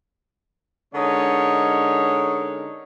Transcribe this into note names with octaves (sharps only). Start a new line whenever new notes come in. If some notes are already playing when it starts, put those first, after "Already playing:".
D3 G#3 C#4 D#4 A#4 C#5